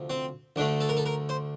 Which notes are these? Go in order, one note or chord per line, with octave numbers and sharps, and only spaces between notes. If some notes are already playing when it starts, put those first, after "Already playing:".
Already playing: D2 C3 F3
C4
D2 D3 A3 D4
A4
A#4
A4
A#4
C5